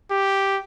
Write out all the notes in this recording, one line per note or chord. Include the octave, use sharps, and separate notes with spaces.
G4